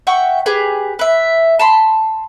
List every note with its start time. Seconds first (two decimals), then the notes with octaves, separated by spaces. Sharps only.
0.07 E5 F#5 G5 C#6
0.46 G4 G#4 B4
0.99 B4 E5
1.59 A5 B5 C6